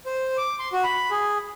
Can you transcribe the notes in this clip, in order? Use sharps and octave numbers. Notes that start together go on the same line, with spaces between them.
C5
D6
C6
F#4
B5
G#4